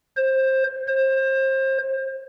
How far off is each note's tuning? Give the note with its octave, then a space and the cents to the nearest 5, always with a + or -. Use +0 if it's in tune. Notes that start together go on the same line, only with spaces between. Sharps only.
C5 +20
C5 +30